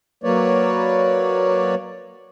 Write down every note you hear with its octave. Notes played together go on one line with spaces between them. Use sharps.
F#3 A#3 B4 C#5 D5